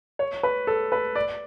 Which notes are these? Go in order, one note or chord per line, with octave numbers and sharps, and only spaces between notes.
C#5
B4
A4
B4
D5